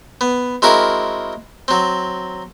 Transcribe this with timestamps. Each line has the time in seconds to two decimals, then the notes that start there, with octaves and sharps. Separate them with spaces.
0.21 B3
0.62 G#3 C4 E4 F#4 A#4 F5
1.68 F#3 C4